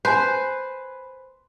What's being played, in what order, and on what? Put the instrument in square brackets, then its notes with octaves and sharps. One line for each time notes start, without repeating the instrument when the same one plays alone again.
[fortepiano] B4 G#5 [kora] C5